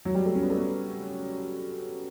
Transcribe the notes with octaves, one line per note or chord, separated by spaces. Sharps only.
F#3
G3
A3
C#4
B3
A3
B3